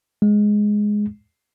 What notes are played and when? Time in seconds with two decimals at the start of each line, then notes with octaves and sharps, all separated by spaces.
0.22 G#3